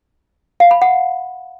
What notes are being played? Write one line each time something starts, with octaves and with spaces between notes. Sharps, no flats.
F5
B5
F#5